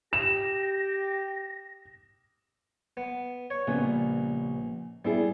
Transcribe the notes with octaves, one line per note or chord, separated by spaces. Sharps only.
G4 A#6 E7
B3
C#5
A#1 C#3 G3 B3
G3 B3 E4 G#4